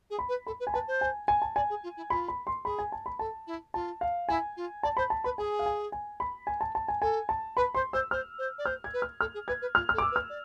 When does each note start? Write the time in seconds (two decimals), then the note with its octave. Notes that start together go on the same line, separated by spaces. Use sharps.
0.10 G#4
0.19 B5
0.29 B4
0.46 A4 B5
0.60 B4
0.67 G#5
0.74 B4 A5
0.88 C5
1.01 G#5
1.28 G#5
1.42 A5
1.56 D5 G#5
1.69 G#4
1.83 F4
1.97 E4
2.10 F4 B5
2.28 B5
2.47 C6
2.65 G#4 B5
2.79 G#5
2.92 A5
3.06 B5
3.19 A4 A5
3.47 E4
3.74 F4 A5
4.01 F5
4.29 E4 G#5
4.56 F4
4.83 D5 A5
4.97 C5 B5
5.10 A5
5.24 B4 B5
5.38 G#4 G#5
5.59 F5
5.66 G#5
5.92 G#5
6.20 B5
6.47 G#5
6.61 A5
6.75 A5
6.88 G#5
7.02 A4 G#5
7.29 A5
7.57 B4 B5
7.75 C5 C6
7.93 C5 E6
8.11 C5 F6
8.38 C5
8.58 D5
8.66 C5 F6
8.84 G#6
8.93 B4
9.02 F6
9.21 A4 F6
9.34 G#4
9.48 B4 G#6
9.62 B4
9.75 F4 F6
9.89 A4 F6
9.98 D6
10.02 E6
10.11 B4
10.16 F6
10.29 D5